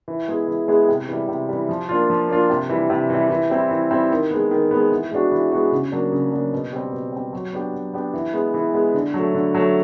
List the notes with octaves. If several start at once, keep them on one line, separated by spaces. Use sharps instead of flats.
E3
G#3 B3 E4 G#4
E3
G#3 B3 E4 G#4
C3
E3 G3
C3
E3 G3
F3
A#3 D4 F4
F3
A#3 D4 F4
C3
E3 G3
C3
E3 G3
E3
G3 C4 E4
E3
G3 C4 E4
D#3
G#3 B3
D#3
G#3 B3
E3
G#3 B3 D4 F#4
E3
G#3 B3 D4 F#4
C#3
F#3 A#3 D4
C#3
F#3 A#3 D4
B2
G3 C4
B2
G3 C4
F#3
B3 D4 G4
F#3
B3 D4 G4
E3
G#3 B3
E3
G#3 B3
D3
F#3
A3
D3
F#3 A3